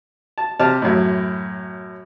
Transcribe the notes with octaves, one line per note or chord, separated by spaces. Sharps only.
A5
C3 A5 F6
F#2 A2